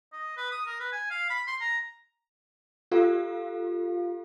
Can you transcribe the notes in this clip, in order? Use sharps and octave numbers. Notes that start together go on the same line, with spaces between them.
D#5
B4
D#6
A#4
B4
G#5
F5
B5
C6
A#5
F4 G4 A4 F5